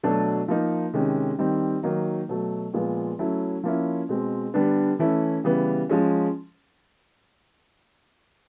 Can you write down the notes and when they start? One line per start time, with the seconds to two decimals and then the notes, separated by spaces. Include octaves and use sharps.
0.03 B2 F#3 A3 D4
0.48 F3 A#3 D#4
0.93 C3 D#3 G#3 C#4
1.39 D#3 G3 C4 D#4
1.83 D#3 F#3 A#3 D#4
2.29 B2 F#3 A3
2.74 A#2 F3 G#3 B3
3.19 F#3 A3 C#4 E4
3.63 F3 A#3 C#4 E4
4.09 B2 G#3 C4
4.54 D3 G3 B3 D4
4.99 E3 A3 C#4 E4
5.44 C#3 E3 G3 B3
5.89 F3 G#3 C#4